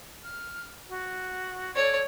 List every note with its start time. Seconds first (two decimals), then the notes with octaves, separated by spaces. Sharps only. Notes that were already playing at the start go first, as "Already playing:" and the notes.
0.22 F6
0.88 F#4
1.75 A4 C#5 D5 G#6